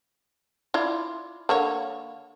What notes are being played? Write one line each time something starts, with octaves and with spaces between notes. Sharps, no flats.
E4 F4 D5
D3 A#3 C#5